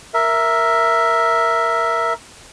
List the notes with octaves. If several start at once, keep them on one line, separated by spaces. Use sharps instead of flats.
A#4 E5